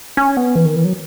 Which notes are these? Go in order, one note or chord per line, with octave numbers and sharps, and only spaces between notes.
C#4
B3
E3
D#3
E3
F#3